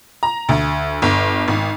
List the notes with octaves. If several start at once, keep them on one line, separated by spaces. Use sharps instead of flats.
A#5
D2
G1
G#1